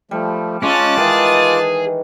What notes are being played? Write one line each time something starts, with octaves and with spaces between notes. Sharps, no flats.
F3 G3 A3
G#3 C#4 F4 D#5 A5 D6 F#6 A6
D#3 E3 G#4